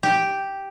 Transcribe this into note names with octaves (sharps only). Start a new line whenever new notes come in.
G4